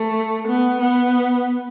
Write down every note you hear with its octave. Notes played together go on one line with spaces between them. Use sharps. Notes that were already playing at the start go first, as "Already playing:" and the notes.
Already playing: A3
B3
B3